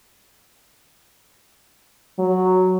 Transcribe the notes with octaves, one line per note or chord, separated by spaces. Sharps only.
F#3